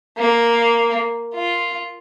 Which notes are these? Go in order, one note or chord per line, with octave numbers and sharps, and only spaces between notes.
A#3
F4